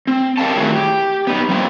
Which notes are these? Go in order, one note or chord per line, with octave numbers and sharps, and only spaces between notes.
C4
G4 A#4 D#5 F5 G5 A5
D#3 F#3 A3 E4 F#4 G#4
G4
B3 D#4
G3 A#3 C4 E4